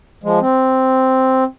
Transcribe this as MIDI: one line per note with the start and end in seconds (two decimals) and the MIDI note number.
0.24 0.39 53
0.24 0.39 56
0.41 1.44 60